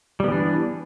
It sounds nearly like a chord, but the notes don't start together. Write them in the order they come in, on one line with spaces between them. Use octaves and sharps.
G3 B3 E3 D4